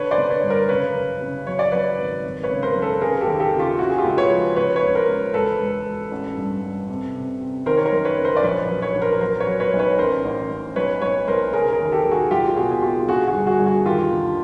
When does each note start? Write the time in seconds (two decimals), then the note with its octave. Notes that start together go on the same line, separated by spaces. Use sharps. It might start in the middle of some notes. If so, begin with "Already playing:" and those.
Already playing: D3 B4 C#5
0.11 C5 D5
0.18 D3
0.30 B4 C#5
0.43 G2
0.50 A#4 C5
0.69 C#3 B4 C#5
0.94 F#1
1.21 C#3
1.47 F#3 C#5
1.59 D5
1.72 F#3 B4 C#5
1.98 G#1
2.24 G#1
2.43 B4 C#5
2.49 C#3
2.63 A#4 C5
2.75 F#2
2.82 A4 B4
3.01 C#3 G#4 A#4
3.21 G4 A4
3.27 D#2
3.40 G4 A4
3.53 C#3
3.59 F4 G4
3.79 C#3 E4 F#4
3.90 G#4
3.98 F4 G4
4.05 C#2
4.17 B4 C#5
4.30 F3
4.56 C#2 B4 C#5
4.75 B4 C#5
4.82 C#2
4.95 A#4 C5
5.08 C#2
5.34 E1 A4 B4
5.60 E1
5.86 E1
6.11 A1
6.37 G2
6.63 G2
6.89 C3
7.15 C3
7.41 C3
7.66 D#3 A#4 C5
7.77 C#5
7.85 A#4 C5
7.92 F#2
8.05 B4 C#5
8.18 F#1
8.24 A#4 C5
8.37 D5
8.43 A#1 B4 C#5
8.69 F#3
8.82 B4 C#5
8.95 A#1
9.02 A#4 C5
9.21 F#3 A#4 C5
9.40 B4 C#5
9.47 F#3
9.60 B4 C#5
9.73 B1
9.79 B4 C#5
9.98 A1 A#4 C5
10.25 A1
10.50 A1
10.76 B1 B4 C#5
11.01 B1 B4 C#5
11.28 B1 A#4 C5
11.53 C#3 G#4 A#4
11.73 G#4 A#4
11.80 D#2
11.92 G4 A4
12.05 D#2
12.11 F#4 G#4
12.31 B1 F4 G4
12.56 B2 F#4 G#4
12.71 G#4
12.83 B2 F4 G4
13.08 D3 F#4 G#4
13.27 F#4 G#4
13.34 G1
13.47 F#4 G#4
13.59 G2
13.66 F#4 G#4
13.86 D#2 F4 G4
14.12 D3